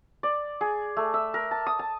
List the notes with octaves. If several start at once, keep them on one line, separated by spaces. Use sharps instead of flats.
D5
G#4
A3
E5
A#4
A5
D#6
A5